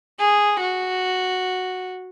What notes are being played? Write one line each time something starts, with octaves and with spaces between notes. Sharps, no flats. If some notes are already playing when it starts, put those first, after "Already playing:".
G#4
F#4